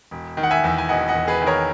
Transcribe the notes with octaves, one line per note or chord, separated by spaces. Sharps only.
E1
D#3
F#5
E5 G#5
E2
G#5
E1 D#5 F#5
D#5 F#5
E1
G#4 B4
D#3
A#4 C#5